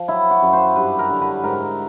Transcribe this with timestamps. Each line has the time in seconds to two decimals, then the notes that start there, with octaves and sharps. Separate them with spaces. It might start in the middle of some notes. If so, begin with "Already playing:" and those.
Already playing: F3
0.08 F#3 E4
0.31 F#4
0.42 F#2
0.53 C5
0.75 G2 B4
0.99 A#4
1.10 D3
1.21 B4
1.44 G#2 A#4